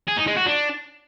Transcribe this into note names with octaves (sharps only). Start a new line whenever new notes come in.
G#4
D#4
G#3
F#4
D4